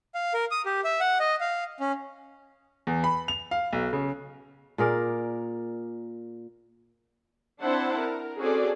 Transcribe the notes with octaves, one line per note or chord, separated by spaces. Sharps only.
F5
A#4
D#6
G4
E5
F#5
D#5
F5
C#4
E2
B5
F7
F5
B1
C#3
A#2 G#4 A#4 D5
C4 D4 E4 C5 F#5 A5
A#4
C4 C#4 F#4 G#4 A4 D5